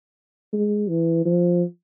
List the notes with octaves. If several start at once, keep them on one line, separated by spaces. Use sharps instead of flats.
G#3
E3
F3